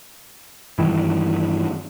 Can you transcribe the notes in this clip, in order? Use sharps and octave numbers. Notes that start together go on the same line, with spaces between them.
G2 D#3 E3